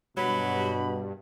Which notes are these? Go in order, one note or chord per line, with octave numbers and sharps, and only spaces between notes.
G2 B2 F#3 B5